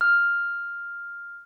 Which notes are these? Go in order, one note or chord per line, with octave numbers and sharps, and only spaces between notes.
F6